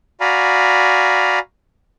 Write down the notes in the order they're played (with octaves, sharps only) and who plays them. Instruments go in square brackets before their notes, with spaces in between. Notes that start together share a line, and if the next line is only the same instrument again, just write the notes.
[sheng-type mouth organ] F#4 D5 F5 G#5 A#5 B5